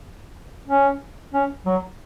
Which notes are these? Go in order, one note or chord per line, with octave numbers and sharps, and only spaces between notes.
C#4
C#4
F#3